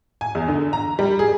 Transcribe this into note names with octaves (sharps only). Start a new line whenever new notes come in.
G#5
E2
D3
A#5
G3
G#4